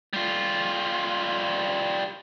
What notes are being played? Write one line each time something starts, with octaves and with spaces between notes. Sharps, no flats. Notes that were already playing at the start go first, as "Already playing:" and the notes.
G3 F4